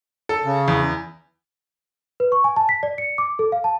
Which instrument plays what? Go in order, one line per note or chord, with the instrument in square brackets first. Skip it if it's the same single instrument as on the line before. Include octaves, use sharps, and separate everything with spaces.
[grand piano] A4
[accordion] C#3
[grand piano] E2
[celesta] B4
C#6
G#5
A5
B6
D5
C#7
D6
A4
F5
A5